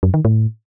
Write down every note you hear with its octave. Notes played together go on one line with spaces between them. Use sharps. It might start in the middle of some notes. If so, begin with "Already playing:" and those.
F#2
D#3
A2